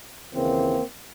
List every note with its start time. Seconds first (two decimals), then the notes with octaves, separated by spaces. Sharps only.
0.33 D#2 C#3 E3 A#3 C4